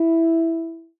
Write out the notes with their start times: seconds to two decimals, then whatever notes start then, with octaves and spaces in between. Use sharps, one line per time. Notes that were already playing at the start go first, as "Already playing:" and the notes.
Already playing: E4